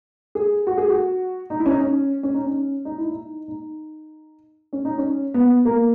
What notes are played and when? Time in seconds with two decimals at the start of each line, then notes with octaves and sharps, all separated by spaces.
0.35 G#4
0.67 F#4
0.77 G#4
0.89 F#4
1.50 D#4
1.60 E4
1.66 C#4
1.70 D#4
1.81 C#4
2.23 C#4
2.34 D#4
2.46 C#4
2.85 D#4
2.98 E4
3.11 D#4
3.48 D#4
4.73 C#4
4.85 D#4
4.98 C#4
5.34 B3
5.65 A#3